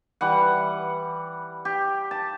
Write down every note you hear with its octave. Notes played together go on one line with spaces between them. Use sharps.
E3 G3 F#5
G4
A5